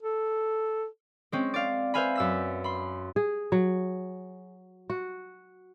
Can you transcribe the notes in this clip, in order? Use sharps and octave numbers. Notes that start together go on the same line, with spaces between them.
A4
G#3 C4 C#4
D5 F5
B4 C5 E5 F5 G#5 B5
F#2 E6 B6
B5 C6
G#4
F#3
F#4